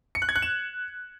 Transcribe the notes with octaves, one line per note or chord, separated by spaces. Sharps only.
C#7
F#6
G#6
F#6
E7